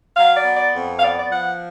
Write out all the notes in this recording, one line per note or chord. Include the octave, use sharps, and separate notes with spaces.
F#3 F5
D5
B3
D5
F2
F5
B3 D5
D5
F3 F#5